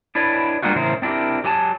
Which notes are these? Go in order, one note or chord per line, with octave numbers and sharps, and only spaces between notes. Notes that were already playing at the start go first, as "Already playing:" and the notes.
D4 E4 B4 C#5 D5
G3 A#3 D4 F4 F#4
A2 C#3 E3 A#4 C5
C4 D4 E4 G4 A#4
F#3 G4 G#5 A5